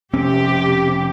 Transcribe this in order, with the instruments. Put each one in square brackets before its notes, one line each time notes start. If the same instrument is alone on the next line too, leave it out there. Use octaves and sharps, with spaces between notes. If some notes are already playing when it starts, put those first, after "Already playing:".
[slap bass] F1 C4 C#4 [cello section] C3 G4